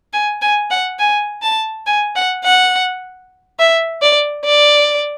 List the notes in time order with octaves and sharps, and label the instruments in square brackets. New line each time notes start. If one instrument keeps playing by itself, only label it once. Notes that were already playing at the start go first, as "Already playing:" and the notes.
[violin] G#5
G#5
F#5
G#5
A5
G#5
F#5
F#5
E5
D5
D5